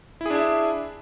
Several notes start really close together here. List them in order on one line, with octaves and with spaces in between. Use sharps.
E4 G#4 D4 E5